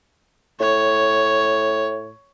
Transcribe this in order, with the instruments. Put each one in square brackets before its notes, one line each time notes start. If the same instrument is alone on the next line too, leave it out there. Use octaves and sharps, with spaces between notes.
[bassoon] A2 [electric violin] C#5